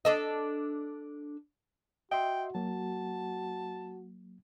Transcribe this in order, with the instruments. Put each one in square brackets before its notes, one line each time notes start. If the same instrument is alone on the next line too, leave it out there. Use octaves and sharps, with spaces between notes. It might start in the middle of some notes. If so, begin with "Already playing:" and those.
[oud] D4 A4 D#5
[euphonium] F#4 [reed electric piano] D#5 E5 C6 [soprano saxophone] G5
[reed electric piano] F#3 A#3 [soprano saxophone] A5